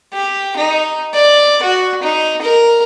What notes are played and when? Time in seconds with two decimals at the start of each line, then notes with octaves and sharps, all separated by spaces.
0.13 G4
0.56 D#4
1.14 D5
1.63 F#4
2.03 D#4
2.42 A#4